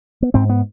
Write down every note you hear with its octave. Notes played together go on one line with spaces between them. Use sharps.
B3
G#2 C4
B3